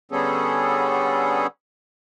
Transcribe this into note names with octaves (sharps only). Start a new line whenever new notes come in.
D3 G3 B3 C#4 G#4 A4